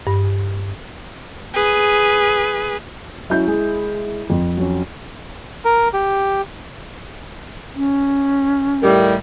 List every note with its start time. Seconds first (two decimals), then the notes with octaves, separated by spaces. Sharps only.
0.07 G2
1.54 G#4 B4
3.30 F#3 C#4 E4 G6
3.47 G#3 G#4
4.30 F2
4.57 F#3 C#4
5.65 A#4
5.94 G4
7.75 C#4
8.83 A2 D#3 G3